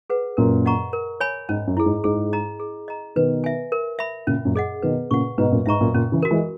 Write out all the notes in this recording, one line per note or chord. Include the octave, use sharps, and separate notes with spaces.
G#4 B4 F#5
F#2 A#2 A#4
D#5 F#5 A#5 C#6
A#4
C#5 G#5 B5
G#2 C#4
F#2
E4 G#4
G#2
G#2 G#4
D#5 A#5
G#4
D#5 A#5
B2 D#3 B4
E5 G#5
A#4
E5 B5
A#2 C#3 C#4
F#2 A#2
G#4 D#5 F#5
B2 D#3 B4
A#2 C#3 F#5 C#6
G#2 B2 B4
F#2 A#2
G#2 E5 A#5 C#6
F#2 A#2
A#2 C#3 C#4
C#3 E3
F#4 A#4
E3 G#3